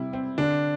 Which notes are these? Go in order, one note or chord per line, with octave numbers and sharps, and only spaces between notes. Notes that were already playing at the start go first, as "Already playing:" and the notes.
Already playing: C3 G3 E4
C4
D3 D4